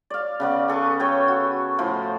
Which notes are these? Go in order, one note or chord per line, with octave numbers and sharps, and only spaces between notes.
D5 F5
C#3 B3 D5
G#4 A4 B4 C#6
A4 C#5 G5
F#4
A2 F3 C5